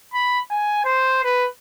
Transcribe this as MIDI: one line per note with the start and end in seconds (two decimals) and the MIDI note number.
0.13 0.39 83
0.51 0.83 80
0.85 1.21 72
1.24 1.46 71